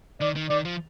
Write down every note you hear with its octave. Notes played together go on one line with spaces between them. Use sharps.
D#3 D5
D#3
D#3 D5
F3